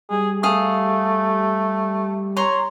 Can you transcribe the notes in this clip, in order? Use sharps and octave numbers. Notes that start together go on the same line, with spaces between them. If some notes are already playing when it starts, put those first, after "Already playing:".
G3 G#4
A3 G#4 F5 D#6
C#5 A#5 C6